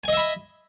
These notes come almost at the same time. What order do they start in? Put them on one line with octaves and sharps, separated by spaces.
G#5 D#5 E5 B5